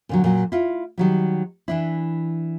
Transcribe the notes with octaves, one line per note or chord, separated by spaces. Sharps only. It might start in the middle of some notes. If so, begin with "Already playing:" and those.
A#2 D3 F#3
A#2 F#3
E4 F4
D#3 F#3 G3
E3 D4 E4